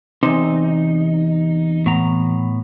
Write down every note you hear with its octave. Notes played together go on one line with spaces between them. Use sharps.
E2 C3 D#4
A2 B3 A#5